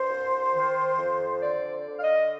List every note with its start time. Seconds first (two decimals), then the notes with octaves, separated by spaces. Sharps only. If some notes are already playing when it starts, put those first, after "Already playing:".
Already playing: G2 C5
0.08 C2
0.53 D#3
0.97 F2
1.42 D3 D5
1.87 D3
1.97 F5
2.02 D#5